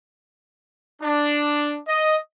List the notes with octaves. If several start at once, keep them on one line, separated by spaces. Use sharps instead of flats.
D4
D#5